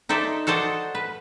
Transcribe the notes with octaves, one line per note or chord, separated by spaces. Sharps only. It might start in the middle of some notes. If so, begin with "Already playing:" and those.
D#4 A4 C5 D5 E5
F#4 A4 C5 D5 D#5
B4